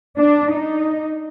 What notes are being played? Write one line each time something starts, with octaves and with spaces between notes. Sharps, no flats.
D4
D#4